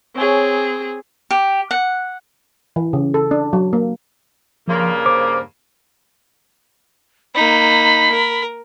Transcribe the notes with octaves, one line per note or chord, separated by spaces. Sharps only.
C4 G#4 C#5 G#5
G4
F#5
E3
C#3
A4
D4
F#3
A#3
G2 C#3 F3 A#3 C6
C5 D6
A#3 D#4 B5
A#4